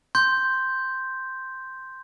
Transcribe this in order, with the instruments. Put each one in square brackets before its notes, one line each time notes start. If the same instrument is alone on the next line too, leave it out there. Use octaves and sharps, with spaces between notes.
[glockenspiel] C6 G6